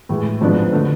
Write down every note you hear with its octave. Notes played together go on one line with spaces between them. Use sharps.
A2 E3 G#3
G#1 G#2 F3 B3 D4
D3 A3